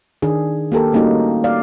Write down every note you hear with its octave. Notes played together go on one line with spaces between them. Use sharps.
D#3 D4 G#4
A#3 G4 A4 A#4
G3 A3 A#3 C#4 D#4 F#4
D5 F5